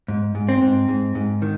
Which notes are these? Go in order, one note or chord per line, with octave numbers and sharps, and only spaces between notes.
G#2
G#2
C4
G#2
G#2
G#2
D#3